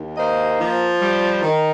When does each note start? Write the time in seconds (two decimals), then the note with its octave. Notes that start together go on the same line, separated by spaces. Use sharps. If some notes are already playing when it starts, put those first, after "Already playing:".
Already playing: D#2
0.17 A#3 C5 D#5
0.58 F3
1.01 G3
1.42 D#3